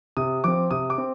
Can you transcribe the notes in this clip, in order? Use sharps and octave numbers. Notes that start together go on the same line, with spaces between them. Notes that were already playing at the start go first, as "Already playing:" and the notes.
C3 D#6
F3 C4 D6
C3 D#6
D6
C4